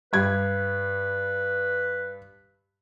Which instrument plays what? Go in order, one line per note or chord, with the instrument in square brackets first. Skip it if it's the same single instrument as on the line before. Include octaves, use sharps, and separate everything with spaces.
[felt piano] G2 G#6 [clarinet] B4